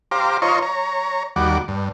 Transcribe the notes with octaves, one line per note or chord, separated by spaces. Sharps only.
G4 C5 F5 A#5 D6
F4 C5 C#5 D#5 A#5 C#6
C#5 A#5
D#2 G3 F#4 D6
G2